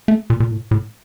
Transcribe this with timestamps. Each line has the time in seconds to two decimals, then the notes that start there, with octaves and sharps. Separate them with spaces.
0.08 A3
0.30 A#2
0.40 A#2
0.51 A2
0.71 A2